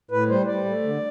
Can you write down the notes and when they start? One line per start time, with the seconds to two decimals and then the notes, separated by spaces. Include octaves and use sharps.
0.11 A2 B4
0.29 G3 C5
0.47 G3 D5
0.65 A3
0.83 D3